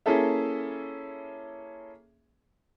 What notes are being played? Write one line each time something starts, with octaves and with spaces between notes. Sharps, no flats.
A#3 C#4 E4 G#4 A4 E5